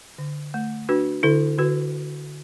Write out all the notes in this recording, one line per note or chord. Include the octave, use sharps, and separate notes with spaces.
D3
A3
D4 F#4 B4
D3 E4 A4
D3 F#4 B4